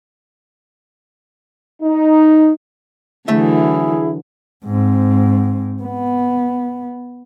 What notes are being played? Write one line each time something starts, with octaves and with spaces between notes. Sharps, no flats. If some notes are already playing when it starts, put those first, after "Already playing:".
D#4
D3 E3 F#3 A3 E4 G#4 E5
G#2 C4
B3